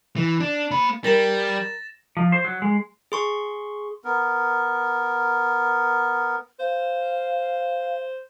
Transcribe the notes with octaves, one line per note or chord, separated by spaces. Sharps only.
E3
D4
A#3 B5
G3 A#4 A6 A#6 E7
F3
C5
F#3
G#3
G#4 C6 C#6
B3 A#4
C5 F5